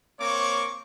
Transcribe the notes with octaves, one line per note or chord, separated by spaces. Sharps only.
A#3 C4 C#5 C#6 D6